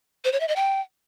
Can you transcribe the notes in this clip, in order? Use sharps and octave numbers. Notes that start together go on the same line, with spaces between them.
C5
C#5
E5
D#5
G5